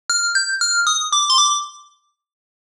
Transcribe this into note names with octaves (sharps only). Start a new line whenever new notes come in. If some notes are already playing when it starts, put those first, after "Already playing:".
F6
G6
F6
D#6
D6
C6
D6